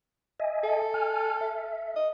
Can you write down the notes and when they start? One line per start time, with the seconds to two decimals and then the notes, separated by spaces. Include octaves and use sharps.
0.40 D#5 E5 G#5
0.64 A4
0.94 G#5 F6
1.41 E5
1.96 D#5